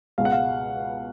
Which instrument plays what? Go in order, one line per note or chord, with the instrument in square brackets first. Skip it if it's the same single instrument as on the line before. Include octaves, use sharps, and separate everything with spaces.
[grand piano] C#2 B2 G#3 F5
F#5
F5